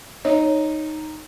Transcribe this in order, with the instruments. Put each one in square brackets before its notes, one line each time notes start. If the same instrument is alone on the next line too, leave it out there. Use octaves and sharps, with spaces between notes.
[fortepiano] D#4 [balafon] C#5